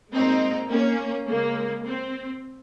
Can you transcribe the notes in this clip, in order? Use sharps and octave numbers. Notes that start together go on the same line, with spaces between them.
A#2 G#3 C4 D#4
A#3 C#4
C#3 G#3 A#3
C4